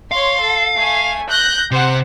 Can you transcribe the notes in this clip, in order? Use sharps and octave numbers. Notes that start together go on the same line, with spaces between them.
C#5 F5 C6
A4
A3 G#5
F#6 G6 A#6
C3 C5 F#5